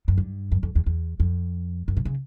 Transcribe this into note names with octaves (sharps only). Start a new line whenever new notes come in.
F#2
G2
F#2
F2
E2
E2
F2
F#2
B2
C#3